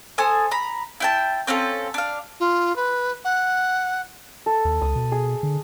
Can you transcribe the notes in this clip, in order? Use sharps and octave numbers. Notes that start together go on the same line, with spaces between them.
A4 C5 G#5 D#6
A#5 B5
E4 G5 A5
C4 C#4 F4 A4
D4 F5
F4
B4
F#5
A4
D#2
C#2 D#6
B2
G#4
D3